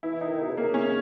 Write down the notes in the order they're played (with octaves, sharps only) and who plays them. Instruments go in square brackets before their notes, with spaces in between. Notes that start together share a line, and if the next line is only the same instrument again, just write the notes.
[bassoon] E3 [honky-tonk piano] E4
[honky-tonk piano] D#4
[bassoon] D#3
[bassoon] B2 [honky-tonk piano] D#4
[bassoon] C#3
[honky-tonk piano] A#3
C#4